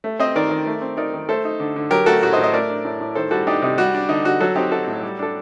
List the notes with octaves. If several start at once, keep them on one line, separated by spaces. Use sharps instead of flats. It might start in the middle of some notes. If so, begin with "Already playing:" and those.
A3
C4 C5 D#5
D#3 A#4 D5
D#3
A3
C4
D#4 A#4 D5
D#3
A3 A4 C5
D#4
D3
D3
F#3 G4 A#4
A3 F#4 A4
A2 F#4
C5 D#5
A2
C5 D#5
A3 A#4 D5
D4
A2
A2
D#3 A4 C5
G3 F#4 A4
D4 D#4 G4
C3 D#4
G3 F#4
D4
D3 D#4
D3 F#4
F#3 F#4 A4
C4 D#4 G4
D#4 F#4 A4
A2
G3
D4 A4